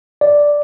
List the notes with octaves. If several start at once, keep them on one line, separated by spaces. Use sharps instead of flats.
D5